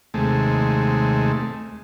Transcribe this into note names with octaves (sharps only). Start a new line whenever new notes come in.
D#2 C3 G#3 A3